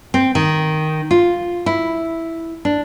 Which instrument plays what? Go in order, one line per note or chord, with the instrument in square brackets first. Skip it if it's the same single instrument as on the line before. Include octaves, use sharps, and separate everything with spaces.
[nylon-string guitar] C4
D#3
F4
E4
D4